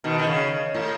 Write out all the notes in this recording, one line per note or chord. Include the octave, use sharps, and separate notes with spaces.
B2 D#3
D#3
C#3
A2